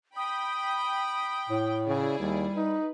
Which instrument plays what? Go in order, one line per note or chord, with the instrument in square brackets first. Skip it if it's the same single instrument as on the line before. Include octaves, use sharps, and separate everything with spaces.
[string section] G5 B5 [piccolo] D#6
[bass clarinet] A2
[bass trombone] C#3 [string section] E4 G#4 D5
[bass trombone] D#2 [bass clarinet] G3
[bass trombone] D#4 [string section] B4